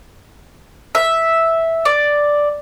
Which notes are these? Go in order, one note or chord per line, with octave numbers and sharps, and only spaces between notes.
E5
D5